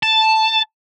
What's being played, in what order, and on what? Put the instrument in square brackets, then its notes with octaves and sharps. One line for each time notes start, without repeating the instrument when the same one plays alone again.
[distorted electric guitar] A5